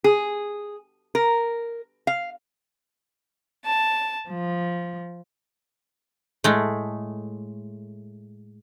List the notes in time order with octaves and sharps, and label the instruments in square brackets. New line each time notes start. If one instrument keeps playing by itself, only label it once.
[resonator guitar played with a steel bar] G#4
A#4
F5
[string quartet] A5
F3
[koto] A2 G#3 A3